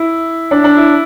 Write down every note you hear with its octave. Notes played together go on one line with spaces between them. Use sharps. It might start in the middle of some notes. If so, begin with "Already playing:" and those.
Already playing: E4
D4
D4
E4